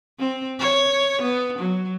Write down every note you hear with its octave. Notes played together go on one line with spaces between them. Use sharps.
C4
C#5
B3
F#3